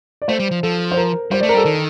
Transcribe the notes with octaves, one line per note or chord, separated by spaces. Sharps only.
D5
A3 C5
G3
F3
F3 A4
C5
A#4
G3 C5
A3 D5
A#4
G3
A4
D#3